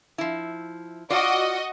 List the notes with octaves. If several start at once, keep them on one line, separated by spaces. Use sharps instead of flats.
F3 E4
F4 F#4 D5 D#5